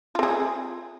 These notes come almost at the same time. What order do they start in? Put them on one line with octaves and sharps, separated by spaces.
F4 C4 G#4